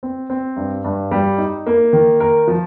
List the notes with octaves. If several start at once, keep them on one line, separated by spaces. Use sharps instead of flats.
C4
C4
G2
G2
G3
D#4
A#3
D#3
A#4
F3